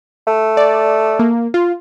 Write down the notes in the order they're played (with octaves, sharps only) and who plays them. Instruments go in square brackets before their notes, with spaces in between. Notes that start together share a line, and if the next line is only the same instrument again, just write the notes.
[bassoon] A3
[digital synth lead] D5
A#3
F4